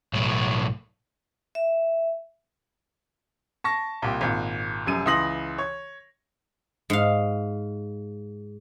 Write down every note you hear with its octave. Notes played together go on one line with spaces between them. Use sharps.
B1 A2
E5
A5 C#6 A#6
C2 A#2 G4
G#1 A#2
F1 F#2 D#7
C#2 E3 C6 D#6 A#6 F#7
C#5
G#2 F5